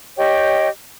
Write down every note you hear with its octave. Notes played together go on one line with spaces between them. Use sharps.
G4 C#5 D#5 G5